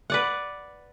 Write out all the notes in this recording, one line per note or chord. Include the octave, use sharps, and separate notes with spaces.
B4 D5 F#5